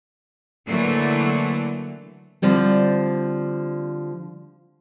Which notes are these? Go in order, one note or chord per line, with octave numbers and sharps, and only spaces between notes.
D3 E3 F#3 A3 A#3
D3 F3 G3 C4